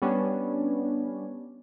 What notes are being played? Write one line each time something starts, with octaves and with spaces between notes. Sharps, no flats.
G3 B3 C#4 D4